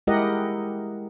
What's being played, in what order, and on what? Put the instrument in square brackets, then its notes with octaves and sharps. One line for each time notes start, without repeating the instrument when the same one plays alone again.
[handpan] G#3 E4 G4 A#4 D#5 F#5